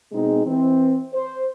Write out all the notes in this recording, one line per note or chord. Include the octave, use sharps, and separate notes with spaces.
B2 G#3 C4 D#4 G#4
E3 C4
C5